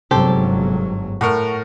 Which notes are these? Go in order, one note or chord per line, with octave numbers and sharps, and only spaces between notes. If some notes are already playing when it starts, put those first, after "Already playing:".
G1 G#2 C3 F#3 G4 A4 C5
A2 A#4 F#5 C#6